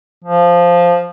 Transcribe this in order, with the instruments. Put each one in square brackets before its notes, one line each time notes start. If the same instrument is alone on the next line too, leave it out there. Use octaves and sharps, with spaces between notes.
[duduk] F3